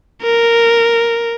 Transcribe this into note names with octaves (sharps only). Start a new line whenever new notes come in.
A#4